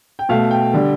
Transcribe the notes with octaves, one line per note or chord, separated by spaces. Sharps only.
G5
B2 A3 F5
G5
D3 G3